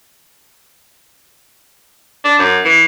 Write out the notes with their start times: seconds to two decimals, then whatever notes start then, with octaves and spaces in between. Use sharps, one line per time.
2.25 D4
2.39 F#2
2.65 E3